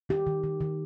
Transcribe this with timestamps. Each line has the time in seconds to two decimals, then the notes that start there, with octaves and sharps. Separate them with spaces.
0.09 D#3 G4
0.27 D#3
0.44 D#3
0.61 D#3